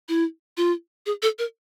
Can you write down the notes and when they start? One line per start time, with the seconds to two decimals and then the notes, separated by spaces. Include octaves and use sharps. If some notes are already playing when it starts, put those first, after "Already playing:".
0.09 E4
0.57 F4
1.06 G#4
1.22 A4
1.39 A#4